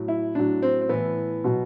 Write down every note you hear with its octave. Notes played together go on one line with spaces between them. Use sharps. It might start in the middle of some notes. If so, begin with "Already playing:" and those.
Already playing: A2 F#3
E4
A2 F#3 D4
C4
C4
A2 E3 B3
B2 F#3